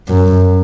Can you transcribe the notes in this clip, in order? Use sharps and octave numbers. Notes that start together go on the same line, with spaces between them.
F#2